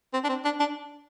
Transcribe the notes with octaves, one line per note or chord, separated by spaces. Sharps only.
C4
D4
C4
D4
D4